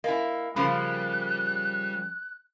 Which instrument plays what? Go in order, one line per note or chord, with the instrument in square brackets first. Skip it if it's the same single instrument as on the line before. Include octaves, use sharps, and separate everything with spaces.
[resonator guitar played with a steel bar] A#3 E4 [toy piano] D#5 G#5
[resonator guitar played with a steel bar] C#3 F3 A#3 [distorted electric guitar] G3 [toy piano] B5 [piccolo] F#6